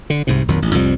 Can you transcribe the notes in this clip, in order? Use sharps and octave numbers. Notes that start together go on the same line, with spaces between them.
D3
C2 G#2 C3
A#1 F2 D#3 F#3
A1
C2 F2 F3 G3